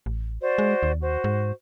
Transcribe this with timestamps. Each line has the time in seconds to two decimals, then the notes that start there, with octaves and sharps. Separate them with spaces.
0.06 A1
0.42 F#4 C5 D5
0.58 G#3
0.83 D#2
1.01 F#4 C5
1.24 G#2